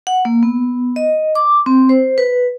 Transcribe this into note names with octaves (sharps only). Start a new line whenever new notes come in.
F#5
A#3
B3
D#5
D6
C4
C5
B4